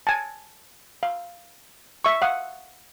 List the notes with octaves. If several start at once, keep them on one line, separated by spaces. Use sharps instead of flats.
G#5 A5
F5
E5 C#6
F5 F#5 D#6